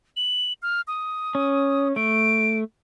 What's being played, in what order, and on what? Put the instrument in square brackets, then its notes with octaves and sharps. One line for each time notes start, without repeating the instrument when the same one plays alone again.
[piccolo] F#7
F6
D#6
[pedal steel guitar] C#4
[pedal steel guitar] A3 [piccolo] D7